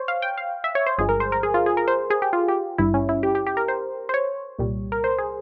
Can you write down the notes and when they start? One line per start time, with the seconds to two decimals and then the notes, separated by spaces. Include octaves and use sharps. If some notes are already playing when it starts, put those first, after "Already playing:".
Already playing: C5 C#5
0.08 F5
0.22 G5
0.38 F5
0.64 E5
0.75 C#5
0.86 C5
0.98 G1 G2 F3 G#3 G#4
1.09 A#4
1.20 C5
1.32 A#4
1.43 G#4
1.54 F4
1.66 G#4
1.77 A#4
1.88 C5
2.10 G#4
2.22 G4
2.33 F4
2.49 G4
2.78 G#1 G2 G3 E4
2.94 C#4
3.09 E4
3.23 G4
3.35 G4
3.47 G4
3.57 A#4
3.68 C5
4.09 C5
4.14 C#5
4.58 C2 A#2 G3
4.92 A#4
5.04 C5
5.18 G#4